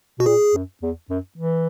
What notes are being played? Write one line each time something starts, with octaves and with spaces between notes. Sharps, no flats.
B2 F#4
A#2 G#4
F#2
E2
F#2
E3